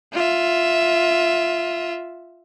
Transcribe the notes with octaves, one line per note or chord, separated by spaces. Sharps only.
F4 E5